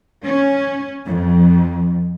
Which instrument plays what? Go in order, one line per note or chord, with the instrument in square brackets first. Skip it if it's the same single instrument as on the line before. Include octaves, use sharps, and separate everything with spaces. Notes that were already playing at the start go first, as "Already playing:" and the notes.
[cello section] C#4
F2